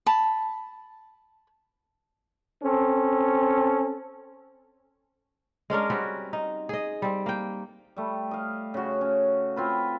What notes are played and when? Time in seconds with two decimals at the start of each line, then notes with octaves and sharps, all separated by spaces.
0.06 A5 B5
2.62 C4 C#4 A4
5.70 G#3 C#4 D4 A#4
5.90 G3 C4 C#4 F#4
6.33 D#4
6.69 G#4 D#5
7.02 G3 C4
7.26 A#3 G5
7.96 G3 A3
8.31 D#5 F5
8.74 C#3 F#4
9.01 C#4
9.56 C4 F4 B4